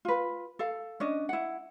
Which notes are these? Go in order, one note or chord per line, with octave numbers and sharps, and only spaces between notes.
F4 B4
A4 F5
C#4 D4 D#5
E4 F#5